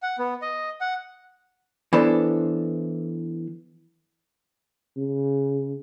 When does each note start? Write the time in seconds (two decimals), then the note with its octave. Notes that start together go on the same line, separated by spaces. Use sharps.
0.02 F#5
0.19 B3
0.42 D#5
0.81 F#5
1.93 E3 B3 D4 A4 C5
4.97 C#3